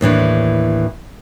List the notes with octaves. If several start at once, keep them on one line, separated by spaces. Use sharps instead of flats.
D#2 A2 E3 D4